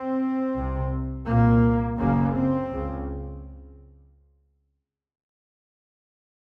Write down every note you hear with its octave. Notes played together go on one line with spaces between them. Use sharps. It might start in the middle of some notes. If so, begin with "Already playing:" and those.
Already playing: C4
C2 C3
C2 A#2 A#3
F#1 F#2 C#3 A#3
C4
C#2 C#3